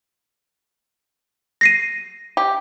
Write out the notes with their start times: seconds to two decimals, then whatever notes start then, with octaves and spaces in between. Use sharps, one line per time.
1.61 A#6 C7 D#7
2.37 G4